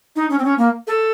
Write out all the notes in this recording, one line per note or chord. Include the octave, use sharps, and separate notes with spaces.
D#4
C#4
C4
C#4
A#3
A4